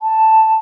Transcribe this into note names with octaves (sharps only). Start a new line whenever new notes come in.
A5